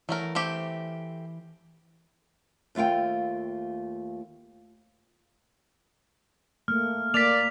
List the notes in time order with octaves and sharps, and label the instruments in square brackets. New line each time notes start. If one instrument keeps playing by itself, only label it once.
[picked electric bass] E3 [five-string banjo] F#3 A3 A#4
[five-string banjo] A3 C4 G4
[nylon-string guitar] D#2 A3 F4 F5 G5
[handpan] A3 A#3 [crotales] F6
[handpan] A#3 [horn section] D5 [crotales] B6 F7